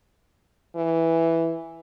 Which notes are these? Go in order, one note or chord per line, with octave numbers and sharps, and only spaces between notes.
E3